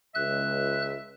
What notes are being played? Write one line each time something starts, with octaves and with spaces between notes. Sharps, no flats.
C#2 E5 F#6